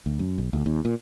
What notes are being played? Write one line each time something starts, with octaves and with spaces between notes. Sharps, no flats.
D2
F#2
B1
D2
D#2
A#2